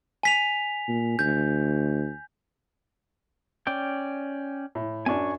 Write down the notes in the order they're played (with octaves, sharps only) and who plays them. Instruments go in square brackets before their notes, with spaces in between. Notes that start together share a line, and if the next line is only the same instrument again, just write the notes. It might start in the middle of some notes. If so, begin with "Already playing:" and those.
[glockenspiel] G#5 B6 F7
[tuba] A#2
[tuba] D2 [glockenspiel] G6
[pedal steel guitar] C#4 D5 G5
[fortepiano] A2
[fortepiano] F#2 D4 [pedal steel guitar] G#5 C#6